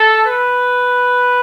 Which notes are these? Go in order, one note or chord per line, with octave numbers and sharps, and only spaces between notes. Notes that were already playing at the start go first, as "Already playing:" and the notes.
Already playing: A4
B4